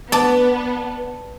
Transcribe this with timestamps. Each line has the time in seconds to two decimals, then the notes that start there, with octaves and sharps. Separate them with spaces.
0.12 B3 D5 A5